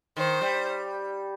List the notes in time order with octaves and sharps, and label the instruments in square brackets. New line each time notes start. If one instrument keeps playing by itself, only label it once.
[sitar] D#3 [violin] C5
[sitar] G3